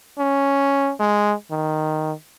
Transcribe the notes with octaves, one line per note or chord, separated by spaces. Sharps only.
C#4
G#3
D#3